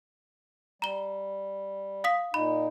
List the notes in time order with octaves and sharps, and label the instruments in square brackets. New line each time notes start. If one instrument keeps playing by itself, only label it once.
[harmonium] G3 [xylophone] A#5 G7
[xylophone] F5 D#6 B6
[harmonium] A#2 D#4 [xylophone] B5